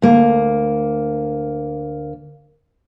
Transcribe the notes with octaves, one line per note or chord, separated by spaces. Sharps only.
D2 A#3